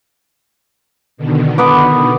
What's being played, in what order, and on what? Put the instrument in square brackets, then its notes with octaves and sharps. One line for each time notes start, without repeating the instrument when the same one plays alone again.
[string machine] B2 D3 D#3
[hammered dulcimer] B3 B4 D6